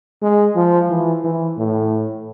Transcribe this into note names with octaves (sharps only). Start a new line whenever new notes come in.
G#3
F3
E3
E3
A2